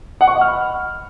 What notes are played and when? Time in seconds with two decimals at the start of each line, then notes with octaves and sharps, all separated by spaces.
0.21 F#5
0.28 C#6
0.34 D#5
0.41 F6
0.48 B5